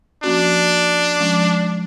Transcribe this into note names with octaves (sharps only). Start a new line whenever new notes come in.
F3 A#3 C#4 D4 F#4
F3 G#3 C#4